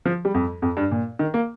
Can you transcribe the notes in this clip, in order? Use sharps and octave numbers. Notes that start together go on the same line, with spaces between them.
F3
G3
F2
F2
G2
A#2
D#3
A#3